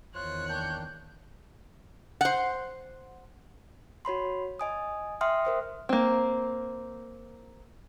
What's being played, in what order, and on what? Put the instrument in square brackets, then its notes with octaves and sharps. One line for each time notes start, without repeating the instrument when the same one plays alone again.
[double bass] E2 D#3 [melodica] F4 C5 [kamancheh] C#5 F#6
[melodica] A#3 D4 G5 [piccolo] G6
[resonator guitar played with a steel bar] C5 F#5
[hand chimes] F#4 C#5 B5 C6
D#5 G#5 D#6
E5 G5 C6 D#6 F6
A#4 C5 E5
[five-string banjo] A#3 C4